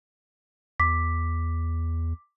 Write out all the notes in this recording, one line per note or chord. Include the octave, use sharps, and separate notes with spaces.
E2 D6 B6